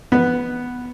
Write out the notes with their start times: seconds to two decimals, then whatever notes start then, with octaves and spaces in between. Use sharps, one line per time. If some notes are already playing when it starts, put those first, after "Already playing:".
0.12 B3